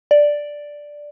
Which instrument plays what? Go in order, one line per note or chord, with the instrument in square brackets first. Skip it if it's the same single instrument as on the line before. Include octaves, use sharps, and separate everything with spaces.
[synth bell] D5